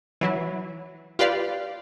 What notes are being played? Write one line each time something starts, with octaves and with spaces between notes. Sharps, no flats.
E3 F#3 E4
F4 G4 B4 D5 F5